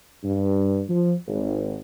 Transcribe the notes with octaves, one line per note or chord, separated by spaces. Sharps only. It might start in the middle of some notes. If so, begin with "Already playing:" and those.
G2
F3
G#1